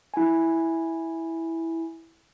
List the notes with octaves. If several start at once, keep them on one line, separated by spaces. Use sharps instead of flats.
E4 G#5